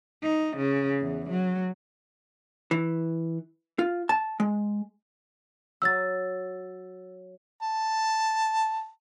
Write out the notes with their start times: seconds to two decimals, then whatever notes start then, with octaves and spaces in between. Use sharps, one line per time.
0.23 D#4
0.57 C#3
1.01 E2
1.30 F#3
2.71 E3
3.79 F4
4.09 A5
4.40 G#3
5.82 F#3 F#4 E6 A6
7.62 A5